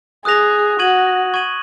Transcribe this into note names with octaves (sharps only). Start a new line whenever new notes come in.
G#4 D#6 F#6 A#6 F7
F#4 C#6 G#6 D#7 F#7
C#6 G#6 D#7 F#7